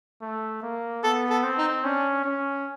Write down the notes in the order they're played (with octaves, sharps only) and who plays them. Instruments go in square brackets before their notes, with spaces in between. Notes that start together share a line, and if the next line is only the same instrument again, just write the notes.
[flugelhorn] A3
A#3
[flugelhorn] B3 [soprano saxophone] A4
[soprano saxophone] A4
[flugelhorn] C4
[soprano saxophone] D#4
[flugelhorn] C#4 [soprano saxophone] D4
[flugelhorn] C#4